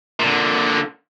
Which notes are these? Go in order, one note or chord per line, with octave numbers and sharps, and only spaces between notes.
A#2 D3